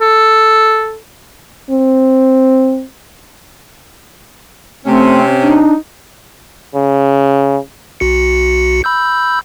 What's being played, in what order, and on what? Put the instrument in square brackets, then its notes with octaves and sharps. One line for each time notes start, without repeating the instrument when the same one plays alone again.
[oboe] A4
[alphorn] C4
[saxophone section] C3 C#4 [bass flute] A3 [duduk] C4
[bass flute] D4 [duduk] D#4
[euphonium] C#3
[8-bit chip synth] B1 F#4 C#7
B5 E6 G6